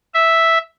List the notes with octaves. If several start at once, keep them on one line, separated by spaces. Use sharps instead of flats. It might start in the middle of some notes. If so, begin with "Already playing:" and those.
E5